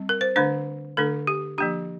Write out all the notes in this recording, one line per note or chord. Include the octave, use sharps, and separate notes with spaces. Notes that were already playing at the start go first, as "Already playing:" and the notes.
Already playing: G3 C4
A#4
C5
D3 A3 D4 C5
D3 A3 D4 A4
G4
F3 A#3 D4 G4